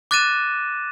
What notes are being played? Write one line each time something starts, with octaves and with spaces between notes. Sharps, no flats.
D6 F#6 A6 A#6 D#7 E7